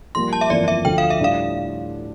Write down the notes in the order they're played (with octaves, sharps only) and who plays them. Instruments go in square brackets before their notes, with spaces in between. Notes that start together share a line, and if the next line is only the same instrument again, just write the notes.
[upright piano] A#1 A#2 G3 A#3 [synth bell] C6
[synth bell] A5
E5
[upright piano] G1 F2 E3 A#3 [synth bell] D5
[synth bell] E5
[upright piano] D2 D3 F3 A3 [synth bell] G5
[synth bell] F5
E5
[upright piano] A2 G3 D4 F4 [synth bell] F5